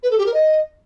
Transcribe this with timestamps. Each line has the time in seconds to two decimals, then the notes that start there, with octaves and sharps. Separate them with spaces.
0.03 B4
0.11 A4
0.18 G4
0.26 A#4
0.34 D#5